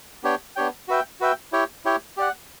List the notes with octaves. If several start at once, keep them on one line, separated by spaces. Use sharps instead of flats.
B3 D4 G4 C#5 G5
B3 D4 G4 C#5 G5
F#4 B4 E5 G5
F#4 B4 E5 G5
E4 G4 C#5 G5
E4 G4 C#5 G5
G4 D5 F#5